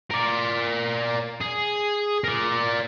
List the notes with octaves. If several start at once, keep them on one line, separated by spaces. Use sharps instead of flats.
A#4 D5
G#4
A#4 D5